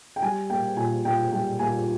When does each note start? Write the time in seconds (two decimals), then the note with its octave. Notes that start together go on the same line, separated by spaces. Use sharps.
0.16 G5
0.22 G3 G#5
0.50 A#3 G5
0.77 A#2 G#5
1.05 A#2 G5
1.32 G3 G5
1.59 A#3 G#5